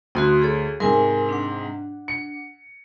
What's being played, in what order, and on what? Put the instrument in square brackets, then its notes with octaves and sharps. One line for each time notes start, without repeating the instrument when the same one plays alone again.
[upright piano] D2 [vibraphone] F#4 C6 D#6
[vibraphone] G#4 A4 C#5
[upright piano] G#2 C3 [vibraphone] A#4 G#5
[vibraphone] D4 F#5
[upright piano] C#7